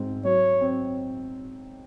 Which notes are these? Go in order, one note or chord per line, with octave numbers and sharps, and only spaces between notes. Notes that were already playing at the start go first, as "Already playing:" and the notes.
Already playing: G#2 C4
F#3 C#5
C4